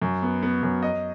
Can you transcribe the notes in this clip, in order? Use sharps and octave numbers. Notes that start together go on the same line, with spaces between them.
F#2
B3
B3
F#2
D#5